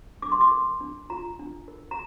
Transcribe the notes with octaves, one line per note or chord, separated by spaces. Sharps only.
D4 D6
C6
D6
A#4
D4
F4 A#5
D4
A#4
A#5